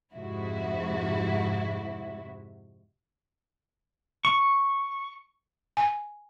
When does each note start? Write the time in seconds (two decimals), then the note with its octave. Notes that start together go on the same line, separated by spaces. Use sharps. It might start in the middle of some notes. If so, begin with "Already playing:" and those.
0.12 F2 G#2 C3 E4 F#4
4.25 C#6
5.77 G#5